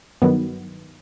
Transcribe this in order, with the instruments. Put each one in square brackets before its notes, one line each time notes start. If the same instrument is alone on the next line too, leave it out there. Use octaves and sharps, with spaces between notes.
[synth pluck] G2 D#3 F#3 B3